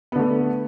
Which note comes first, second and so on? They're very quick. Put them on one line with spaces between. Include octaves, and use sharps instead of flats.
B3 D3 A3